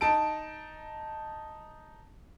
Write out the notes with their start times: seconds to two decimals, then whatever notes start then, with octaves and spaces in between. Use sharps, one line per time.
0.01 D#4 A5 D7